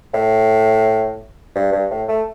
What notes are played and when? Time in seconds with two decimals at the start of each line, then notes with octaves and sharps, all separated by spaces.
0.14 A2
1.56 G2
1.72 G2
1.91 A2
2.08 A3